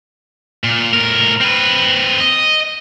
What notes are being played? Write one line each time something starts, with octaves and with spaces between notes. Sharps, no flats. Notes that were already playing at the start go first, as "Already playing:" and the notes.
A#2
A2 A#4
C4 B4
D#5